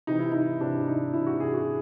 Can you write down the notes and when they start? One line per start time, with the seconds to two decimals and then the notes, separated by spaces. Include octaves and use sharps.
0.07 C3 E3 D#4
0.19 E4
0.32 D#4
0.61 C3 E3 D4
0.88 D#4
1.13 C3 E3 E4
1.27 F#4
1.40 G#4
1.54 F#4